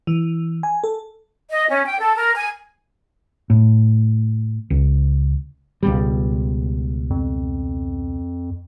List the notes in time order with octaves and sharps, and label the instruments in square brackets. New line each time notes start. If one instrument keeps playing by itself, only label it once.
[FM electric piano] E3
G#5
A4
[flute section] D#5
C#4
G5
A4
A#4
G#5
[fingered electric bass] A2
C#2
[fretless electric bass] C#2 B2 G3
[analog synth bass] F2